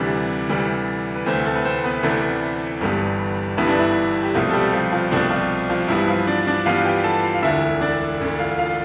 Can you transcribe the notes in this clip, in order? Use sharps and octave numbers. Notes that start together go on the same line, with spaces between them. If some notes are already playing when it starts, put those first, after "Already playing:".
Already playing: D2 C3 E3 G3 D4 D5
D2 C3 E3 G3
B4
D2 C3 E3 A3 C4 C5
A3 A4
B4
C4 C5
B3 B4
D2 C3 E3 A3 C4 D4
G1 G2 E3 G3 B3
G1 G2 E3 G3 B3 E4
D4
E4
G4
C2 B2 F3 A3 C4 F4
A4
G3 G4
F3 F4
F3 F4
C2 B2 A3 C4 D4
F3 F4
F3 F4
G2 E3 G3 B3 E4
F3 F4
D4 D5
D4 D5
G2 E3 G3 B3 F4 F5
G4 G5
A4 A5
F4 F5
F5
E1 D2 D3 E4 E5
D4 D5
E1 D2 D3
F4 F5
F4 F5